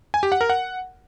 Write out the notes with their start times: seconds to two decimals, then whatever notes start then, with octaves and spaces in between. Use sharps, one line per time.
0.14 G#5
0.23 G4
0.32 F#5
0.41 A#4
0.50 F#5